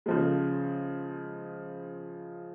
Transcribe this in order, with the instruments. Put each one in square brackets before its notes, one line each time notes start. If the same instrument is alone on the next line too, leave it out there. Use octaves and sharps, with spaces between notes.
[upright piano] C#3 F3 G#3